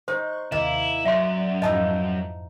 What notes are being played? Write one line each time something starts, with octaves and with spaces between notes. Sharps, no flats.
D#4 C5 C6 C#6 F#6
D#2 C3 A#3 E4 D#5
F#2 D5 E5 C6
F2 G#2 F3 D#4 E4 D#5 A5